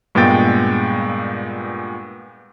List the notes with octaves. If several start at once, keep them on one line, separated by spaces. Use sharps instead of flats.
G2 A#2 G#3 B3 G5 A6